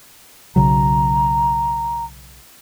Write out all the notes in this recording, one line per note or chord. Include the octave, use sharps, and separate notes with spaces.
B1 C#3 F#3 A#5